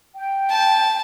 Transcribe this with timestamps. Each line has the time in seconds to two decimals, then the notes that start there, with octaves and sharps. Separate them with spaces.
0.15 G5
0.50 A5